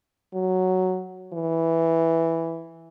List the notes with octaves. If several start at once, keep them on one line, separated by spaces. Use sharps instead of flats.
F#3
E3